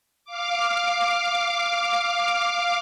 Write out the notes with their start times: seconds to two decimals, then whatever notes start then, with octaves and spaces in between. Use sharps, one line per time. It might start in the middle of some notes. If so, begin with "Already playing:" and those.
0.25 F5 D6